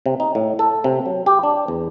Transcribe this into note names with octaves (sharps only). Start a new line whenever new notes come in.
C3
D#4
A2
A4
C3
F#3
G4
D4
E2